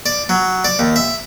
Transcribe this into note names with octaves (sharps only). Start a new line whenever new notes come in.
D5
F#3
D5
D#2
E5